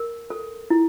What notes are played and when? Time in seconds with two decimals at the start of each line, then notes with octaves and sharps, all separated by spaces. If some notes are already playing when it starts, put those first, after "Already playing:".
Already playing: A#4
0.30 A4
0.70 E4